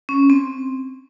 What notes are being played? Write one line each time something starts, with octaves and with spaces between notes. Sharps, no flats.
C#4
C4